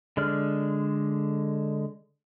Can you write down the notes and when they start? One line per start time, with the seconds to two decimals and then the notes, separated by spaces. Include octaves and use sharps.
0.17 D3 G#3 D5 F6